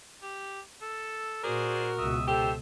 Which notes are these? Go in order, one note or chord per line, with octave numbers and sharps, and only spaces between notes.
G4
A4
A#2 F#4 G#4 A#4 C5 D5
C#2 B2 E5 D#6
G4 A4 C5 E5